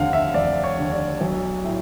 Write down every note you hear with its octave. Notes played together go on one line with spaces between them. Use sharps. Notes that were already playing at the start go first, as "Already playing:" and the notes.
Already playing: F1 D#2 D3 F5 F#5
E5
F1 D5
C#5
D#2 D3
D5
B1
A2